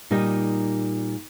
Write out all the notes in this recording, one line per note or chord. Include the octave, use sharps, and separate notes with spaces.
A#2 G3 D#4 A#4 D#5